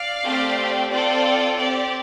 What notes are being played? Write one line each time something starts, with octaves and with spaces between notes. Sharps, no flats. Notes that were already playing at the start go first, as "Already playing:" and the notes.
Already playing: D5 F5
A3 C4 G4
C4 F4 A4 D5
C4 G4 D5